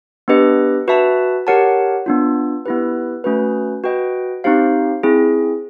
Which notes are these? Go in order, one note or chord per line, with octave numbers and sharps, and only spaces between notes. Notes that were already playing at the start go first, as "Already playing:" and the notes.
B3 D4 G4 B4 D#5
F#4 B4 E5 A5
G4 A#4 C#5 F#5 A5
B3 D4 F4
B3 E4 G4 B4
A3 C#4 F#4 B4
F#4 B4 D#5 G5
C4 D#4 G4 C5 F5
C4 E4 G#4